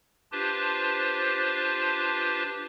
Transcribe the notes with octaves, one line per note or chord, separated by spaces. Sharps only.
D4 F4 G4 B4 C5 A5